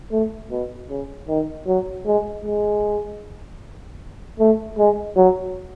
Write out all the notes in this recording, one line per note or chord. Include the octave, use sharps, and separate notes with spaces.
A3
B2
C#3
D#3
F#3
G#3
G#3
A3
G#3
F#3